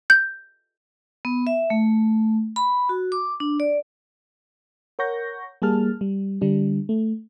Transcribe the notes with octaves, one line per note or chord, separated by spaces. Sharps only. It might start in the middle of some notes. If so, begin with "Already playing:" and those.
G6
B3
E5
A3
B5
F#4
D6
D4
D5
A#4 C#5 F#5 C#6 G6 A#6
G3 A#3 G#4 A5 F6
G3
D3 G3 D4
A3